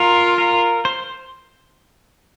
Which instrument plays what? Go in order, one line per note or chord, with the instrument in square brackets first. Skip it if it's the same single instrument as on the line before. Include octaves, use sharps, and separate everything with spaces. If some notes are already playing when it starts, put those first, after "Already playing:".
Already playing: [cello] F4 [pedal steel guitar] A#4
[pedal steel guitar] A#4
C5